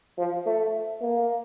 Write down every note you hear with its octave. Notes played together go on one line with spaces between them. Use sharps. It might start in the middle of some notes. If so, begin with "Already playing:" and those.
F3
A3
A#3